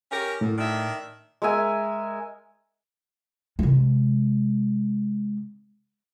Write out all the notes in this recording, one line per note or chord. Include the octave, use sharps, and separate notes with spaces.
C#4 G4 A#4
F#2 A2
D#3 D4 E5
G#3 A#4 E5 G#5
C3 G#3